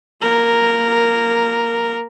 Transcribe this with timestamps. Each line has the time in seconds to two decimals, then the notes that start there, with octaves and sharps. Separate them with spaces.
0.22 A#3 A#4